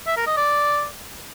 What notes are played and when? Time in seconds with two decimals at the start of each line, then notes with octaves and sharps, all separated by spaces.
0.07 E5
0.17 A#4
0.27 D#5
0.37 D5